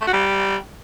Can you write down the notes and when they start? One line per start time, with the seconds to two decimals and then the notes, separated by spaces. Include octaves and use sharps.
0.01 A3
0.07 F#4
0.13 G3